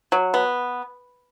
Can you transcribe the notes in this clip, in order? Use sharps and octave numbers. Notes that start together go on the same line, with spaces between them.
F#3
B3